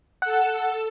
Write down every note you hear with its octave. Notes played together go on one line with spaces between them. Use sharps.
A4 F#5 E6